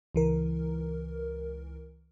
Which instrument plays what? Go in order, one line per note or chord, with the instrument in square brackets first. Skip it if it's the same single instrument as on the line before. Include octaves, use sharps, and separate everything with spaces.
[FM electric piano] C#2 E3 A#4